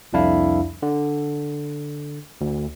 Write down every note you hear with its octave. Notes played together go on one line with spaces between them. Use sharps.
C2 F2 D4 E4 F5
D3
D2